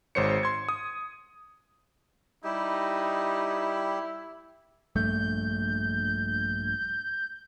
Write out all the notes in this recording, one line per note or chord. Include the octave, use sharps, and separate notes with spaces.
G#1 G#2 C5 C#5 C#7
C6 G#6
D#6
G3 D#4 E4 G4
A#1 G2 A3 G6